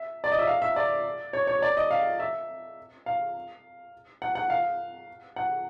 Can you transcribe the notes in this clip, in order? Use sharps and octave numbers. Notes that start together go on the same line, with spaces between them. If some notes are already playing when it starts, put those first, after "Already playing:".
Already playing: E5
D5
D#5
E5
F5
E5
D5
C#5
C#5
D5
D#5
F5
E5
F5
F#5
F#5
F5
F#5